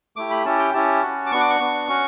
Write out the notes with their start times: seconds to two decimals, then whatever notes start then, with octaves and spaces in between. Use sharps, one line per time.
0.16 A3 E4 G4 D6
0.31 B5
0.45 C#4 E4 G4 A5
0.59 G5
0.74 C#4 E4 G4 A5
1.02 C#4 F#4
1.26 D6
1.31 B3 D4 F#4 C#6
1.40 D6
1.50 C#6
1.60 B3 D4 F#4
1.88 C#4 F#4